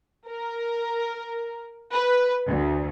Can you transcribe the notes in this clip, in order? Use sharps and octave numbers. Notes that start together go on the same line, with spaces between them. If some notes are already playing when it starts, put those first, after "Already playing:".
A#4
B4
D2